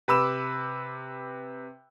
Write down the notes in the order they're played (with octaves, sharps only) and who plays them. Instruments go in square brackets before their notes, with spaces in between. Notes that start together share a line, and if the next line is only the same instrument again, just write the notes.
[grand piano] C3 B4 B5 D6 E6 E7